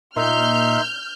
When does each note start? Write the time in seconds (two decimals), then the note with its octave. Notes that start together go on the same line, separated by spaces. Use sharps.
0.16 A#2 D#4 E5 C6 F6 G6